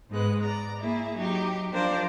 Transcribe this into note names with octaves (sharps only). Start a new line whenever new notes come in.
G#2 G#3 B3 F#6
D5 A#5
A#3 E4 G#4
F#3 D#4 G4
F3 D4 A#4 C5 D5 F5